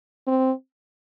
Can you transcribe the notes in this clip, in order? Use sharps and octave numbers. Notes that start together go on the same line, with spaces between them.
C4